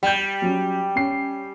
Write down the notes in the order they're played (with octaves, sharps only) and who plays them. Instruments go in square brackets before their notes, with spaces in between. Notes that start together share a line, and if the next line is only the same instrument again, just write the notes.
[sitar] G3 [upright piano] G5 G6
[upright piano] F#3 C#4
C#4 C7